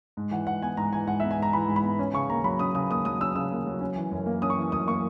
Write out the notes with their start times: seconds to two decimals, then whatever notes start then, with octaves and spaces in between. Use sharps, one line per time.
0.17 G#2
0.31 E3 F#5
0.47 G#2 F#5
0.62 B3 G#5
0.77 G#2 A#5
0.92 E3 G#5
1.07 G#2 F#5
1.20 B3 E5
1.31 G#5
1.38 G#2 A#5
1.53 E3 B5
1.68 G#2
1.76 B5
1.83 B3
1.99 C#4
2.13 C#3 C#6
2.30 D#2 A#5
2.44 F#3 B5
2.59 C#4 D#6
2.75 C#3 D#6
2.90 D#2 D#6
3.05 F#3 D#6
3.20 C#4 E6
3.35 C#3 E6
3.51 D#2
3.67 F#3
3.81 C#4
3.96 E3
4.12 F#2
4.26 A#3
4.42 C#4 D#6
4.50 C#6
4.57 E3
4.72 F#2 D#6
4.87 A#3 C#6